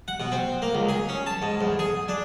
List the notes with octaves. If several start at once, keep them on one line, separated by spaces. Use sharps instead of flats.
F#5
B2
C4
A#3
C#2
G#4
C#4
A5
G#2
E2
G#4
D4